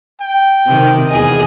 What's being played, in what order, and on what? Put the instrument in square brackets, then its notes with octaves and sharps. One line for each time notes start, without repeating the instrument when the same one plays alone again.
[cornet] G5
[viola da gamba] C3 D#3
E2 G#4 D#5